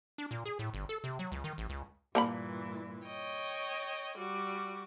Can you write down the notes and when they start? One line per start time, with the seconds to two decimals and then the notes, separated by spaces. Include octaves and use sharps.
0.18 D4
0.31 A#2
0.46 G#4
0.59 A2
0.74 G1
0.89 A4
1.04 C3
1.19 F#3
1.32 C#2
1.44 D#3
1.58 A1
1.69 C#2
2.15 G2 A#2 E3 A#3 A#5 B5
3.05 C#5 D#5 G5
4.17 G3 F#4 D6